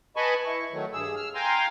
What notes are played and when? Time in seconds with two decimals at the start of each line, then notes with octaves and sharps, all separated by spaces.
0.16 B4 D#5 G#5 A5 B5 C#6
0.45 E4 C#6
0.72 D#3 F#3 A3
0.93 G2 G#4 E6
1.16 E6 F6
1.35 F5 G5 G#5 A#5 C6